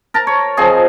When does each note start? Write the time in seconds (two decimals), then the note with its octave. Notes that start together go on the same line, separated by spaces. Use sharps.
0.14 A#4 A5 A#5
0.27 C#5
0.57 F3 C4 G#4 D#5